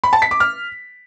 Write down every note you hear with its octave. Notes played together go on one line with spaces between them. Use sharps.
B5
A5
B6
D6
F6